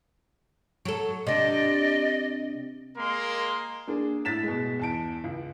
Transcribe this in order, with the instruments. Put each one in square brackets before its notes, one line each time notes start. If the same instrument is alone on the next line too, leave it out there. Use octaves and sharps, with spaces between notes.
[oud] F#3 A4
[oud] C3 D4 [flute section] D5 D#5
[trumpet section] G#3 A#3 A#4 C6
[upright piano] A#3 D4 G#4
A2 A6 B6 E7
B2 G#3
E2 A5 D7
C#2